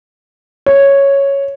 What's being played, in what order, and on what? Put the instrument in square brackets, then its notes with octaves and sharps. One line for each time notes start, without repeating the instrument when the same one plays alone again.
[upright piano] C#5